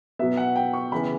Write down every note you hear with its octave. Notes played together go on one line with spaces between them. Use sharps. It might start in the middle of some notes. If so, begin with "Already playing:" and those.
B2 F#3 B3 E5
F#5
G5
C#6
C#3 E3 B3 B5